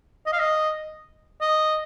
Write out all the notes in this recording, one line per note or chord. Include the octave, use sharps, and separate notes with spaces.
D#5
F5
D#5
D#5